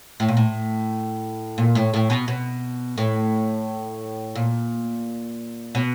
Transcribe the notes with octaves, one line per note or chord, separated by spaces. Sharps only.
A2
A#2
A2
A#2
A2
A2
B2
B2
A2
A#2
B2